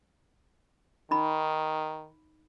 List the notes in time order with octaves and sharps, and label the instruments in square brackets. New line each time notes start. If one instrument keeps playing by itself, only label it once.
[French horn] D#3 [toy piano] D#4 B5